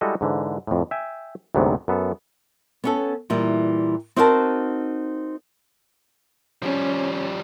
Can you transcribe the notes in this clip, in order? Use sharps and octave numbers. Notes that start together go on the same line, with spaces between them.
G3 G#3 E4 F#4 A4 D#5
G#2 D3 E3
F2 A2
E5 G5 G#5
D2 G#2 C3 F#3 B3
F#2 B3 A4
B3 C#4 A4
A#2 E3 G3
C4 D#4 F#4 A#4 C5 A5
F3 G3 C#4